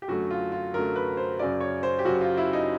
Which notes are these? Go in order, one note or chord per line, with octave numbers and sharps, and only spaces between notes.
G4
F#2 D3 F#3 A3 F#4
F4
F4
F#2 D3 F#3 A3 A#4
B4
C5
F#2 C#3 F#3 D5
C#5
C5
G4
F#2 C#3 F#3 F#4
F4
E4
D#4